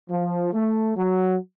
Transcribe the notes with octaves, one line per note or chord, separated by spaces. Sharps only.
F3
A3
F#3